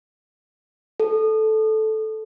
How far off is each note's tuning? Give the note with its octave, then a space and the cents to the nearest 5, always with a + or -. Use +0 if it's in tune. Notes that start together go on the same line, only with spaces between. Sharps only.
A4 -10